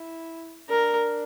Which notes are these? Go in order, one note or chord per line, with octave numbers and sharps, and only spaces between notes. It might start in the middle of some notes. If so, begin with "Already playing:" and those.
Already playing: E4
D4 A#4